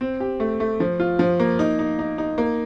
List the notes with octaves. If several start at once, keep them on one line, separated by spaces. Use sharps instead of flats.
C4
G4
A3
A3
F3
F4
F3
A#3
D#4
D#4
D#4
D#4
A#3